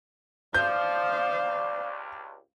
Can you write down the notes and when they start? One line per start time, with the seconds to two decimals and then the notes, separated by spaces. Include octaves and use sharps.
0.54 F3 C5 D5 F5 G6
1.42 C#2 G2